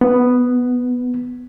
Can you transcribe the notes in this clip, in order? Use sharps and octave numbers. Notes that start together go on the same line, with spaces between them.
B3